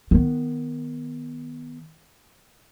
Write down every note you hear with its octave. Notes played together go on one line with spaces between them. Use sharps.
D#3 B3